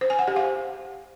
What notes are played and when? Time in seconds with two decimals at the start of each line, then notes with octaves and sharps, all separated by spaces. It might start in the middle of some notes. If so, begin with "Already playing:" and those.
0.01 C5
0.10 G#5
0.19 F#5
0.28 G4
0.36 F5